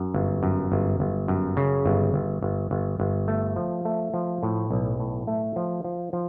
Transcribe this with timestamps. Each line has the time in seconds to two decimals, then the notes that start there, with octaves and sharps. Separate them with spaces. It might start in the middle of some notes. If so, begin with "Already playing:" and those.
Already playing: F#2
0.14 G1
0.43 F#2
0.72 G1
1.00 G1
1.28 F#2
1.57 C#3
1.86 G1
2.14 G1
2.42 G1
2.71 G1
3.00 G1
3.28 A3
3.56 F3
3.85 A3
4.14 F3
4.43 A2
4.71 B1
5.00 A2
5.27 A3
5.56 F3
5.84 F3
6.13 F3